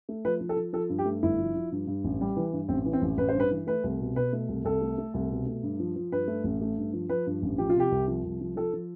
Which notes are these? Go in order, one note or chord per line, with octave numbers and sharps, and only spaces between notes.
A3
F3 B4
F3
A4
F3
F3 A4
G2
G4
A3
G1 E4
F3
F3
G2
G2
A1
G3
E3
G2
A1 C4
E3
C4
A1
A1 B4
C5
G2
B4
E3
A3 B4
C2
B2
B2 B4
A3
C2
C2 A4
A3
A3
C2
B2
A3
G2
F3
F3
G2 B4
A3
A1
A3
G2
F3
F3 B4
G2
A1
F3 G4
F4
C3 G4
C2
F3
C2
F3
F3 A4
F3